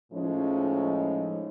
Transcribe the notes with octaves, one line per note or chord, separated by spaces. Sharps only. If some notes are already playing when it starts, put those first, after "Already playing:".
A2 F3 G#3 C#4 D#4